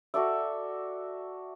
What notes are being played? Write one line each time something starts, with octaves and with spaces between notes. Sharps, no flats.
F#4 A4 D5 E5